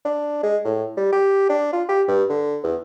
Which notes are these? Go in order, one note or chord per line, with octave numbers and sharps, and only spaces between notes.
D4
G#3
A2
G3
G4
D4
F4
G4
G2
D3
E2